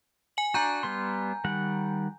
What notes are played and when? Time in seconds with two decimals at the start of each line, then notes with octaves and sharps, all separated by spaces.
0.37 G#5 F#7
0.54 D4 F#4 G#5 A#5 G6
0.83 G3 B3 C6
1.44 D#3 G3 F#5